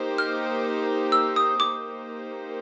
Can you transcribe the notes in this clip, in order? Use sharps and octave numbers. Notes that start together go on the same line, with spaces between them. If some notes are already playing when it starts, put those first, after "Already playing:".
Already playing: A#3 D#4 G4 C5
F6
E6
D#6
A#3 D#4 G4 C5 D6